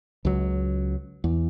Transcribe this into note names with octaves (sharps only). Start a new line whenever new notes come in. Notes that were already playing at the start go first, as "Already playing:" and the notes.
C#2 F#3
E2